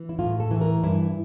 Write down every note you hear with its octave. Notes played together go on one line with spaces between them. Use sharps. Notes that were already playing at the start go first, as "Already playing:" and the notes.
Already playing: E3
E4
A2 F4
A4
E3
A#4
G2 E4